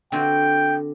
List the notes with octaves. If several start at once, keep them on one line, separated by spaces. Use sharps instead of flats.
D3 C4 F#4 G5